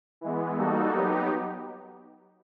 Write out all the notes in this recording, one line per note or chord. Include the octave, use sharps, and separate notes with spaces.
E3 G#3 B3
G3 A#3 D#4 F#4 A4
F#3 B3 D#4 G4